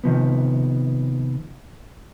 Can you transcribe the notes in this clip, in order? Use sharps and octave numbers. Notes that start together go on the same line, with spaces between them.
C3 D#3 F3 B3